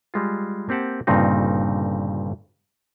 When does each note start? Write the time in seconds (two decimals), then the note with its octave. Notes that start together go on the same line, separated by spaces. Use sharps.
0.14 G3 G#3 F4
0.69 A#3 C4 G4 F#5 A5
1.07 G1 G2 A#2 C#3 C4 D#4